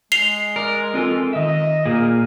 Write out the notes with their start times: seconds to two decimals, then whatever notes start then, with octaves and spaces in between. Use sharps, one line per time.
0.12 G#3 C7 F7 G7
0.56 A#4 D5
0.94 C4 F4 A4
1.33 D#3 D#5 E5
1.86 A#2 A#3 G#4